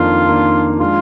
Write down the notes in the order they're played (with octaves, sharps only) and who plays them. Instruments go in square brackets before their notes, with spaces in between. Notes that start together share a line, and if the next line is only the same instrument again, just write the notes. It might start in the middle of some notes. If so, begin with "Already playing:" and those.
Already playing: [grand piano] F2 D#3 A#3 D4 [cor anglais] F4
[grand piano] F2 D#3 A#3 D4
[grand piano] F3 G#3 D4 [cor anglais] F4